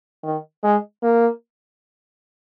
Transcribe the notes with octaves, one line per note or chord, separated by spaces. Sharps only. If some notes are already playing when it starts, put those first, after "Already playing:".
D#3
G#3
A#3